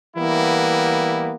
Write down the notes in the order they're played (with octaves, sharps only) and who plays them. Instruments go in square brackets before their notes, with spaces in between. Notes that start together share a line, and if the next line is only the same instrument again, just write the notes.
[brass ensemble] E3 G3 A#3 B3 E4